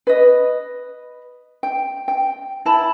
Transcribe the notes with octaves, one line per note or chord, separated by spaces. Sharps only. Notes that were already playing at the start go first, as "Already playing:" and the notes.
B4 D#5
G5
G5
E4 A5 B5